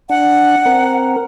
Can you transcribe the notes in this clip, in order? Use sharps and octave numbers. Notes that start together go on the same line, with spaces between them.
D4 F#5
C4 A#4